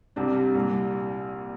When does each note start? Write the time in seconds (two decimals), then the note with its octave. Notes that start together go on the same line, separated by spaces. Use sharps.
0.16 C2 C3 G3 D4
0.55 C2 A#2 G3